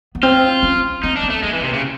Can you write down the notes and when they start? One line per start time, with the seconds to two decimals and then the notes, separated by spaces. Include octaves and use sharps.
0.15 B3
0.23 C4 F4
0.63 C#4
1.03 C4 D#4
1.16 D4
1.23 B3
1.30 A3
1.43 G#3 A#3
1.53 E3
1.63 C3
1.74 C#3